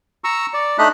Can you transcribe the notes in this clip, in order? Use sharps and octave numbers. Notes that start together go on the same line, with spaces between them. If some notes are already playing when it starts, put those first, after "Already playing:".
A#5 C#6 E6
D5
A3 D4 D#4 D#5 B5 F#6